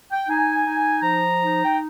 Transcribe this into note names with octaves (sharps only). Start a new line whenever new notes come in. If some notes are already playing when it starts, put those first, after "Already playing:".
G5
D#4 G#5
D#4
F3 A#5
D#4
G5